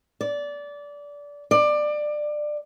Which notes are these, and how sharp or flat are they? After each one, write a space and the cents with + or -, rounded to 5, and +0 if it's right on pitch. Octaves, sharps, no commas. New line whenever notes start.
D5 -20
D5 +20